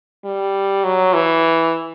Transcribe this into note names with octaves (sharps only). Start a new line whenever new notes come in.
G3
F#3
E3